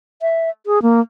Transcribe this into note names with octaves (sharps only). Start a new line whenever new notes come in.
E5
G#4
A#3